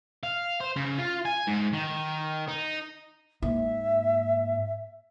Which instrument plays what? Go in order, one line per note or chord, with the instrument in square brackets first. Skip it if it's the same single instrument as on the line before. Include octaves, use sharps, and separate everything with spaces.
[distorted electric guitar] F5
C5
C#3
F4
G#5
G#2
D#3
D#4
[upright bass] G#2 A#3 [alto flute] E5